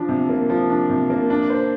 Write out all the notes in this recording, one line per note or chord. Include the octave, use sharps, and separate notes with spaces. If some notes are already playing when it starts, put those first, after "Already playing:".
Already playing: F3 D4
C3
A#3
F3
D4
C3
A#3
D4
C5